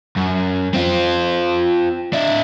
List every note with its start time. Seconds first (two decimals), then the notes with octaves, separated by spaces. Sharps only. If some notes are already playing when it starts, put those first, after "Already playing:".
0.17 F#2
0.74 C4 F4
2.13 D4 E4